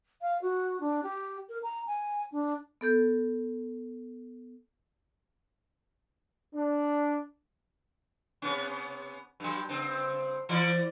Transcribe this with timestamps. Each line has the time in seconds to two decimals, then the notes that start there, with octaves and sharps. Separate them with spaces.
0.22 F5
0.42 F#4
0.80 D4
1.03 G4
1.49 A#4
1.63 A#5
1.87 G#5
2.32 D4
2.81 B3 A4 G6
6.55 D4
8.42 C3 B3 C#4
9.40 G2 F#3
9.69 G2 C#3 C4
10.49 E3 E4 D5